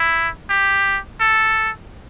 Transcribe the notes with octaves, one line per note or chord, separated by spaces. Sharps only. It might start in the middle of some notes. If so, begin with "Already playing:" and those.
Already playing: E4
G4
A4